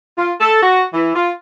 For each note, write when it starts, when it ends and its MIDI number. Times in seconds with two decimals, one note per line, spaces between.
0.18 0.33 65
0.41 0.62 69
0.63 0.83 66
0.94 1.13 52
1.16 1.31 65